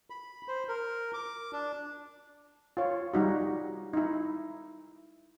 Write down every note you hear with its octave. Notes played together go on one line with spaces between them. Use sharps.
B5
C5
A#4
D6
D4
F4 C#5
G3 D#4 F#4
D#4 E4